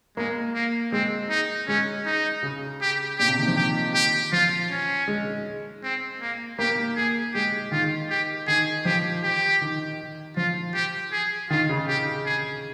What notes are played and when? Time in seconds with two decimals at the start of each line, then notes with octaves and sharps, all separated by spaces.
0.17 G#3 A#3
0.54 A#3
0.92 G#3 C4
1.30 D#4
1.68 G#3 C#4
2.06 D#4
2.43 C#3
2.81 G4
3.19 A#2 G4
3.28 C3
3.38 D#3
3.48 F3
3.57 D#3 G4
3.95 G4
4.33 F3 F4
4.70 C#4
5.08 G#3
5.83 C4
6.21 A#3
6.59 A#3 G4
6.97 G#4
7.35 G#3 G4
7.72 D#3 F4
8.10 G4
8.48 D#3 G#4
8.85 F3 G4
9.24 G4
9.62 D#3
10.37 F3 F4
10.74 G4
11.12 G#4
11.50 D#3 F4
11.69 C#3
11.88 G4
12.26 G#4